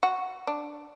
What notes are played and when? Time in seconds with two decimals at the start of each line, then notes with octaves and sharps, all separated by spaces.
0.03 F#4
0.47 D4